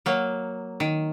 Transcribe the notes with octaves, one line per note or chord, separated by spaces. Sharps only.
F#3 A#3
D#3